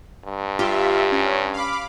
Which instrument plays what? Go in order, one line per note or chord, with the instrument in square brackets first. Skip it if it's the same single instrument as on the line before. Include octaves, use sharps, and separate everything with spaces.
[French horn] G2
[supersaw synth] F4 E5 [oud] G4
[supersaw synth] C#4
F5 B5 D6